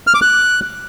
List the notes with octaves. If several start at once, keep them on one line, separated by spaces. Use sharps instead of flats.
F6
D6
F#6